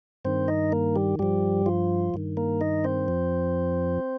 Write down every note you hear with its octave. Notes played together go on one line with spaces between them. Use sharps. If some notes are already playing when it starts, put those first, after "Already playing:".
G2 D#3 C4 C5
D#4 D#5
A#3 A#4
G3 G4
G2 F3 G3 G4
F3 F4
G2 D#3
A#3 A#4
D#4 D#5
C4 C5
F2 F3